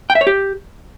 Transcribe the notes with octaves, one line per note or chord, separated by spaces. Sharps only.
G5
E5
C#5
G4